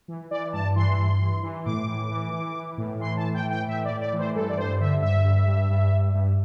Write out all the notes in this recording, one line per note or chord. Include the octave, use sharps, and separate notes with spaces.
E3
E3 D5
G2 A5
E3 C6
G2
E3
E3
A2 D6
E3
E3
E3
E3
A2
E3 C6
A5
A2
G5
E3
G5
A2 E5
D5
A2
D5
E3
C5
G2 A4
D5
G2 C5
D3 E5
G2 E5
G2
G2
G2
G2
G2